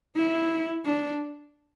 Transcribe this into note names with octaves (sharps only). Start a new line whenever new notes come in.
E4
D4